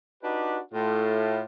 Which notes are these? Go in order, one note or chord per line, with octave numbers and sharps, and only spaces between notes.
D4 D#4 F#4 G4 B4
A2 F4